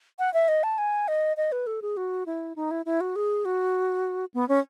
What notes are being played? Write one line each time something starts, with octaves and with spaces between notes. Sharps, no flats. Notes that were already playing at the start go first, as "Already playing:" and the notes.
F#5
E5
D#5
A5
G#5
D#5
D#5
B4
A4
G#4
F#4
E4
D#4
E4
E4
F#4
G#4
F#4
B3
C#4